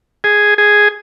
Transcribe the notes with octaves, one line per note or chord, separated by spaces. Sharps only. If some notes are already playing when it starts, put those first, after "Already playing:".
G#4
G#4